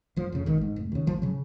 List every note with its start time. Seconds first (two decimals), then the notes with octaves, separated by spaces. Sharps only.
0.16 F#1 F3
0.32 F2 C#3
0.46 G#1 D#3
0.61 G#2
0.76 F1
0.92 D#2 C#3
1.07 G#1 F3
1.22 C#3 F#3